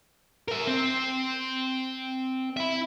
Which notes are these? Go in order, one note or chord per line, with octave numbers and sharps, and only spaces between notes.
A#4 E5
C4
E4 E5